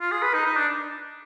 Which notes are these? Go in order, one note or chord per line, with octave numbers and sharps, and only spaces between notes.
F4
G#4
B4
D#4
D#4
D4